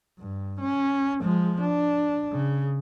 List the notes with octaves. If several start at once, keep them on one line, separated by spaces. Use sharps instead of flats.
G2
C#4
F3 G#3
D4
C#3